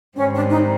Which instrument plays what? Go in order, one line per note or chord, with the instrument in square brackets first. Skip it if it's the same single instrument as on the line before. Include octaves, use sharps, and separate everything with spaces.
[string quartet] G#2 D#3 G3 C4 [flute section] C#4
[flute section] D4
D#4